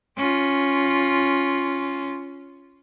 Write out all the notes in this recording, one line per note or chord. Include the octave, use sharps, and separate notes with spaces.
C#4 F4